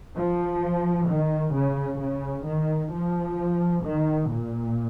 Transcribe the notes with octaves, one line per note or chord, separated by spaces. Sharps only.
F3
D#3
C#3
C#3
D#3
F3
D#3
A#2